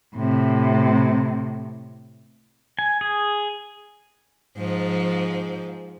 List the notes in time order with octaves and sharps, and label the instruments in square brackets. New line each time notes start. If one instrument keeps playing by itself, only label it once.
[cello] A2 C3
[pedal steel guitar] G#5
G#4
[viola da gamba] G#2 F3